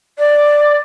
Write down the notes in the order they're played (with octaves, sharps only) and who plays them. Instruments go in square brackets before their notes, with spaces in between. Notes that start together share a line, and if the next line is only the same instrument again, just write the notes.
[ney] D5